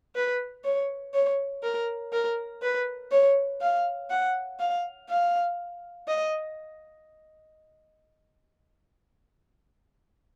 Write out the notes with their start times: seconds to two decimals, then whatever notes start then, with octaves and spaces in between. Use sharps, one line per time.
0.15 B4
0.64 C#5
1.14 C#5
1.63 A#4
2.12 A#4
2.62 B4
3.12 C#5
3.61 F5
4.10 F#5
4.60 F5
5.09 F5
6.08 D#5